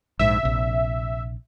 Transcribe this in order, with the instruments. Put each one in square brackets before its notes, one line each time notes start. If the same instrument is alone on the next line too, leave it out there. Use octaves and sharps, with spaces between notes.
[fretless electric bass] A#1 G#2 [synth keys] E5
[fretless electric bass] A#1 C3